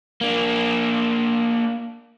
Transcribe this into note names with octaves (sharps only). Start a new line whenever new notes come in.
A#3 D4